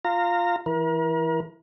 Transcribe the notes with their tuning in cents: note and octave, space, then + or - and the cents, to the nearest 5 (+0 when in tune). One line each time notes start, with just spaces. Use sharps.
F4 +0 A#5 -20
E3 +0 A#4 +40